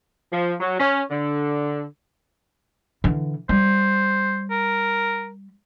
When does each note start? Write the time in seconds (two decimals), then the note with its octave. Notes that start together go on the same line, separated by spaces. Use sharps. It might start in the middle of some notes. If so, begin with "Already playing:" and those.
0.32 F3
0.60 F#3
0.79 C#4
1.10 D3
3.04 D3 E3
3.49 G3 C5
4.51 A#4